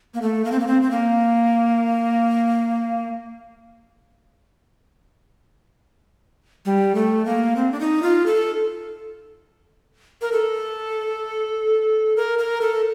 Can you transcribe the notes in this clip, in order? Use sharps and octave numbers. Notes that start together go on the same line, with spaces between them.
A#3
A3
A#3
C4
A#3
C4
C4
A#3
G3
A3
A#3
C4
D4
D#4
F4
A4
A#4
A4
A#4
A#4
A4